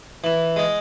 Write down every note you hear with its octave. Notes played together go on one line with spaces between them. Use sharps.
E3
G#3